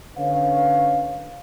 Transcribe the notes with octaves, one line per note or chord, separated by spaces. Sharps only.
D3 C#4 B4 C#5 F5